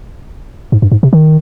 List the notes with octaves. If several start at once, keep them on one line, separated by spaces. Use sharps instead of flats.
G#2
G2
G#2
C3
D#3